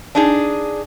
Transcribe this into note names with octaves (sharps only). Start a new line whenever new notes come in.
D4 D#4 G#4